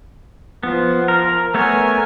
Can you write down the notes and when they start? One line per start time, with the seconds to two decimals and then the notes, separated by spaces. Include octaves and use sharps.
0.63 F3 B3
1.08 A#4
1.54 A3 B3 A#4 C#5 G#5